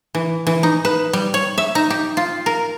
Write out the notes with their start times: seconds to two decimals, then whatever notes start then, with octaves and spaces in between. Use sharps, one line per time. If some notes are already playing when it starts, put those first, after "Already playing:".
0.15 E3
0.47 E3
0.63 D#4
0.85 B4
1.13 G3
1.34 C#5
1.58 E5
1.75 D#4
1.90 G4
2.17 F4
2.46 A#4